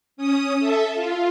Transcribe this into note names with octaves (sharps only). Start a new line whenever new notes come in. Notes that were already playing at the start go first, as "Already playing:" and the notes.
C#4 D#6
A4 E5
F4